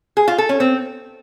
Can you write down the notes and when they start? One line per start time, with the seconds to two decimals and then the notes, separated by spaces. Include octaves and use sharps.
0.17 G#4
0.28 F4
0.38 A4
0.49 C#4
0.60 C4